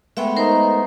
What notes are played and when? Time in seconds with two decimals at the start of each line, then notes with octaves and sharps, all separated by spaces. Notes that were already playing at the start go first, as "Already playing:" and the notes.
0.17 G#3 A3 B3 E5 G5 B5
0.37 D#4 A#4 C5